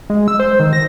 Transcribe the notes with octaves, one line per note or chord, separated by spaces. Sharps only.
G#3
E6
C5
D#3
A#6